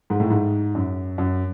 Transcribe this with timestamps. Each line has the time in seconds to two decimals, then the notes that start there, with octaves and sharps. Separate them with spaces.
0.10 G#2
0.20 A2
0.30 G#2
0.75 F#2
1.18 F#2